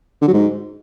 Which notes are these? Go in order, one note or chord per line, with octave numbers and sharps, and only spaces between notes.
D3
F#3
G#2